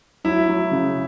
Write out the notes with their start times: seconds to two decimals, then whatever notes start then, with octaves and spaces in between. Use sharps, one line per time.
0.24 F#3 E4
0.48 F#3
0.71 C#3